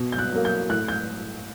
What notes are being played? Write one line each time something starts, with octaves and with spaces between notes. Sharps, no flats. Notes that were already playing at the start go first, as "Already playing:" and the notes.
Already playing: B2
G6
F#6
F#3 A#3
G6
A2 F#6
G6